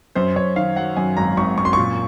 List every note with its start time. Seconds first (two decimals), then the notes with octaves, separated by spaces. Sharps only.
0.15 F#2 C5
0.36 F#2 C#5
0.56 D#3 F5
0.77 F#3 F#5
0.96 F#2 G#5
1.17 G#1 A#5
1.37 G#1 C#6
1.58 F#2 C#6
1.65 C6
1.73 A#2 C#6